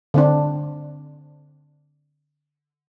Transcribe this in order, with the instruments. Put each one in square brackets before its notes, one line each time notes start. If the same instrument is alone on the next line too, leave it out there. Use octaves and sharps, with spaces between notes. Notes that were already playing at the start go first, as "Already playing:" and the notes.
[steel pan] D3 C4 D4